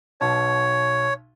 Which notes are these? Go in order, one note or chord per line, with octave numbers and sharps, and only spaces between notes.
B1 B2 C#5 A5